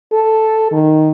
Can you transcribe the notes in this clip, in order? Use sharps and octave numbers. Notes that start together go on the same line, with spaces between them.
A4
D#3